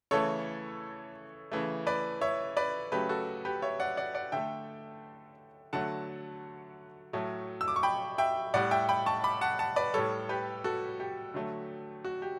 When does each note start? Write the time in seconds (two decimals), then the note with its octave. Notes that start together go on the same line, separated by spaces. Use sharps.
0.11 C#3 E3 A3 A4 C#5
1.52 C#3 E3 A3
1.87 B4 D5
2.21 C#5 E5
2.57 B4 D5
2.92 C#3 F#3 A3 G4 B4
3.09 F#4 A4
3.45 G4 B4
3.62 C#5 E5
3.80 D5 F#5
3.97 D5 F#5
4.15 D5 F#5
4.32 D3 A3 E5 G5
5.73 D3 F#3 A3 F#5 A5
7.13 A2 F#3 A3
7.61 E6
7.68 D6
7.76 C#6
7.83 G5 B5
8.18 E5 G5
8.54 A2 G3 D5 F#5
8.71 E5 G5
8.89 G5 B5
9.06 A5 C#6
9.24 B5 D6
9.41 F#5 A5
9.59 F#5 A5
9.76 B4 D5
9.94 A2 G3 A4 C#5
10.29 G4 B4
10.64 F#4 A4
11.00 G4
11.34 D3 F#3 A3
12.05 F#4
12.22 G4